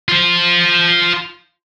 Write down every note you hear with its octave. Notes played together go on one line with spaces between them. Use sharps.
F4 C5